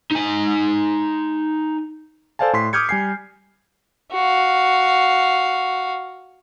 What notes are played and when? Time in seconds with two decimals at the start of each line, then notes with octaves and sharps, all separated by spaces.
0.11 D#4 G#5
2.39 A4 C5 D5 F5 G#5 A5
2.53 A2 C6 B6
2.73 D6 D#6 F6 G6 G#6 C#7
2.89 G3 G#5 C7
4.13 F#4 F5